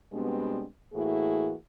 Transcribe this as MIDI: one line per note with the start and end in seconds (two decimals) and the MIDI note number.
0.12 0.64 47
0.12 0.64 55
0.12 0.64 56
0.12 0.64 59
0.12 0.64 60
0.12 0.64 62
0.93 1.53 45
0.93 1.53 52
0.93 1.53 58
0.93 1.53 64
0.93 1.53 66
0.93 1.53 68